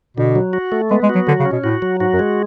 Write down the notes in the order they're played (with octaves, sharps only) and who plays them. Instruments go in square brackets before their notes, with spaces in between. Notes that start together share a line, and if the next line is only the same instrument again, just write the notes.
[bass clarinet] B2 [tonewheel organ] D3
[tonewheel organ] F#3
F#4
A3
[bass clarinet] G#3 [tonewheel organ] B3
[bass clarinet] G#3
[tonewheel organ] F#4
[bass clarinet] F#3
[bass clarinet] D3 [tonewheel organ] F#3
[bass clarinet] C#3
[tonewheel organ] C#4
[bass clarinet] B2
[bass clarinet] A2 [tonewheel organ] F#4
[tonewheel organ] F#3
[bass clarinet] G#2 [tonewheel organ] F#4
[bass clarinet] F#2
[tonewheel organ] G#3